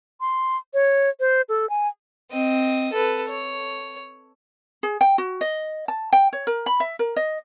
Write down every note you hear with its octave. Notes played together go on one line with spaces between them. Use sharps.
C6
C#5
C5
A4
G#5
C4 D#5
A4 B4
C#5
G#4
G5
F#4
D#5
A5
G5
C#5
A#4
B5
E5
A#4
D#5